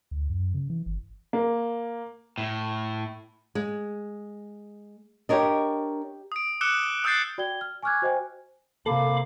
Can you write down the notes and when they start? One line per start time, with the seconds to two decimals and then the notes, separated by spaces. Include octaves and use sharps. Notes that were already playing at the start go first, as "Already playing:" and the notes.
0.11 D2
0.30 F#2
0.54 C#3
0.70 E3
0.86 G1
1.33 A#3
2.38 A2
3.55 G#3
5.29 D4 G4 A#4 C#5 D#5
6.32 D#6 D7
6.61 D6 E6 F#6 C#7 E7 G7
7.04 D#6 E6 F#6 G6 A6 C7
7.38 F#4 D5 G5 G#6 G7
7.61 F6
7.83 G#5 C#6 D6 F6 F#6 G#6
8.02 F#4 C5 D#5 G5 G#5
8.86 C3 A#3 A4 F5 B5 D6